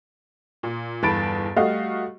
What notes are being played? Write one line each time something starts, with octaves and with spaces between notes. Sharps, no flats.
A#2
G1 E2 A5 B5 A6 D7
G3 A3 F#4 D#5 F5